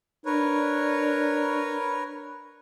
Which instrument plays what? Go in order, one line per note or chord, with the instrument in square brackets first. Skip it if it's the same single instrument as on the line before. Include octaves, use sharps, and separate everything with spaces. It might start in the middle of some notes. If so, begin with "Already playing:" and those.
[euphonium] D4 [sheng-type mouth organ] A#4 B4 C#5